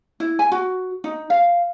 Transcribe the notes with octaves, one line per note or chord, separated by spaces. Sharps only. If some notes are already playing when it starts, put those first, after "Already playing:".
E4
G#5
F#4
D#4
F5